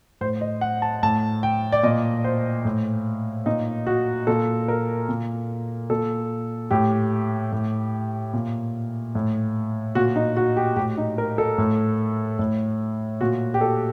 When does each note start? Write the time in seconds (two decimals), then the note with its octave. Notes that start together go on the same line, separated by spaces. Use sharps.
0.21 A2 C5
0.41 D#5
0.61 F#5
0.82 A5
1.03 A2 A5
1.43 G5
1.72 D5
1.83 A#2 D#5
2.24 C5
2.65 A2
3.46 A#2 D#4
3.87 F#4
4.27 A#2 A4
4.68 A#4
5.09 A#2
5.90 A#2 A4
6.71 A2 G4
7.52 A2
8.33 A#2
9.15 A2
9.95 A#2 F#4
10.16 D#4
10.37 F#4
10.57 G4
10.76 A2 G4
10.98 D#4
11.18 A#4
11.38 A4
11.58 A2
12.39 A2
13.21 A#2 F#4
13.54 G4
13.61 A4